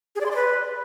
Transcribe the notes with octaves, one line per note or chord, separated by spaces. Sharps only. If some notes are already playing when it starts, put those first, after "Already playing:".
G#4
D5
C6
D5
B4